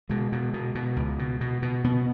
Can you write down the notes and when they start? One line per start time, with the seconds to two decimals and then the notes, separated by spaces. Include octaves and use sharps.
0.09 B2 G#3
0.32 B2
0.54 B2
0.75 B2
0.96 C#2
1.19 B2
1.41 B2
1.62 B2
1.84 B2 B3